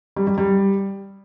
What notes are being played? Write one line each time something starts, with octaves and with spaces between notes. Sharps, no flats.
G3
G3
G3